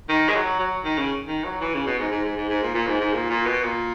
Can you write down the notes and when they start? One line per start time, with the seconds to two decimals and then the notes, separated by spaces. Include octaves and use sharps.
0.09 D#3
0.29 G#3
0.35 F#3
0.59 F#3
0.85 D#3
0.98 C#3
1.28 D#3
1.44 F#3
1.61 E3
1.74 C#3
1.86 B2
1.99 G#2
2.12 G#2
2.24 G#2
2.37 G#2
2.49 G#2
2.62 A#2
2.74 A#2
2.87 G#2
3.00 G#2
3.13 A#2
3.30 A#2
3.46 B2
3.64 A#2